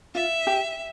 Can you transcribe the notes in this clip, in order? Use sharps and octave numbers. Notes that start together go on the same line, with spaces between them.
F4 E5
G4